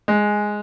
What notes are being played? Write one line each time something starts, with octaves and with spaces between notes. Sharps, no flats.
G#3